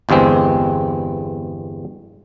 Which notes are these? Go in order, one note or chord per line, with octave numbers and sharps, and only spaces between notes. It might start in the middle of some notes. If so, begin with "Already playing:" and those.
G1 E2 G2 G#3 C4